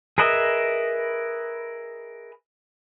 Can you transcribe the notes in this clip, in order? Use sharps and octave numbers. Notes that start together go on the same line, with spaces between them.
G#4 A#4 B4 D#5 E5